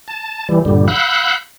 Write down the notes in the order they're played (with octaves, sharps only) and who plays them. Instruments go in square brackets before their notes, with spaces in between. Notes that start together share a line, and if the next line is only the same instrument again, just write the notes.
[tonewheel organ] A5
E3 G3
G2 A#2 D3 G3
F5 F#5 B5 E6 F#6 G6